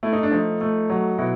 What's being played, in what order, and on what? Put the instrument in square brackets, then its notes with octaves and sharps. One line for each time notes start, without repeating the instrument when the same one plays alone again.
[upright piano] A3 E4
D#4
D4
F3 D#4
A3
F#3
B2 E4 F#4